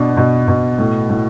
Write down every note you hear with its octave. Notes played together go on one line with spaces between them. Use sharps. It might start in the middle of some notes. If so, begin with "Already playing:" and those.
Already playing: B2 D4
B2
B2
A2
A2